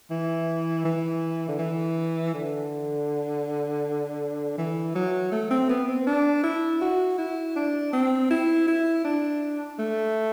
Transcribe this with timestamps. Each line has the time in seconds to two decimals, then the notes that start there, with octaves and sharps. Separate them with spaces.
0.10 E3
0.85 E3
1.49 D3
1.59 E3
2.34 D3
4.58 E3
4.95 F#3
5.32 A3
5.51 C4
5.69 B3
5.88 C4
6.07 D4
6.44 E4
6.81 F#4
7.18 E4
7.56 D4
7.93 C4
8.31 E4
8.68 E4
9.05 D4
9.79 A3